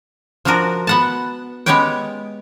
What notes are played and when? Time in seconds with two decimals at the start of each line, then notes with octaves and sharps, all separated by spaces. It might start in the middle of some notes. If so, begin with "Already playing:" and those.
0.45 F3 D4 F4 F#4 A#4
0.87 B3 F#5 A5
1.66 G#3 B3 C#4 G4 C#5 G5